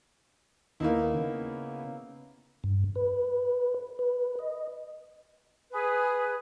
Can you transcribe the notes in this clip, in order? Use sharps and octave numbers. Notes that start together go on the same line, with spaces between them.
D#2 D#3 A#3 B3 D#4 E4
C#3 B3
G2
B4
B4
D#5
G#4 B4